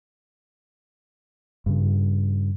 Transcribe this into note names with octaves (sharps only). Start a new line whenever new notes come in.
G2 C#3